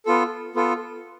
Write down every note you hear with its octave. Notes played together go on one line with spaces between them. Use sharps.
B3 F4 A4
B3 F4 A4